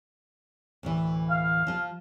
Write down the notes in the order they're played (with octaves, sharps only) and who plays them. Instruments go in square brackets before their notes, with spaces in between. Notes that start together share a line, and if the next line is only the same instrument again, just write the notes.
[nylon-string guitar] D2 A2 E3
[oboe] F5
[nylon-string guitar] F3 F4